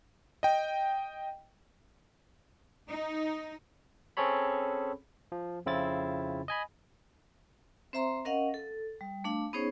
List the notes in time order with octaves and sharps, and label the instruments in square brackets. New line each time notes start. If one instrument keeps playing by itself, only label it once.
[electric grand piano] D#5 G5
[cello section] D#4
[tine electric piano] C4 C#4 G#4 A4 C#5 B5
F3
F2 C#3 C4 E4 F4 A6
D#5 G#5 B5
[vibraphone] C4 C5 E5 A#5 C6
C#4 A#4 D#5 F5 F#5
A4
G3
A3 D4 F5
B3 C#4 D#4 G#4 C5 C#5